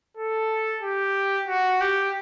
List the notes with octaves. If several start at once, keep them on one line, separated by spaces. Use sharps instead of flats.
A4
G4
F#4
G4